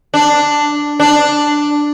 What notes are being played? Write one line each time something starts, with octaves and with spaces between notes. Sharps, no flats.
D4
D4